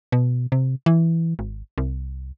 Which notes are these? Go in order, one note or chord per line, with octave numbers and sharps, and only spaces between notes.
B2
C3
E3
G#1
C2